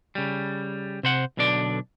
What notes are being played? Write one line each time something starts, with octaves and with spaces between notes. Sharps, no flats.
C#3 G3
C3 C5 F#5
B1 B2 D3 D4 D5